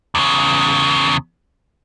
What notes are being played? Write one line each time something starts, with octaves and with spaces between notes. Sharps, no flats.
E2 C#3